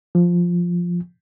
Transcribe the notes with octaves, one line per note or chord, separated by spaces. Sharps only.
F3